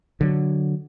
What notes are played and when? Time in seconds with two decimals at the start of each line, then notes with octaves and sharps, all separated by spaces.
0.21 D3 F#3